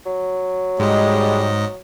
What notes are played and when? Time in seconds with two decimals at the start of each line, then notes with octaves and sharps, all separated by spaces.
0.06 F#3
0.80 G#2 G3 G#3 D#5